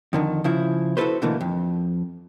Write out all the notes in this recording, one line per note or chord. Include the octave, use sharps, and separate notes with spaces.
F2 D3 D#3
C#3 F3 E4
E4 F#4 G4 A4 B4 C5
B2 D3 E3 A3 A#3
F2